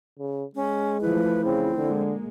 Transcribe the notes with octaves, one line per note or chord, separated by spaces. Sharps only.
C#3
G#3 C#4
E3 F3 A3 E4 B4
C#3 C4
D3 G#3 A#3